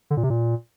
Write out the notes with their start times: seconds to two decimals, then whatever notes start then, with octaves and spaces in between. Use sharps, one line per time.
0.10 D3
0.17 A#2
0.23 C3
0.30 A#2